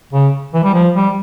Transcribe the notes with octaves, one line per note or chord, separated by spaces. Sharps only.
C#3
E3
G3
F3
G3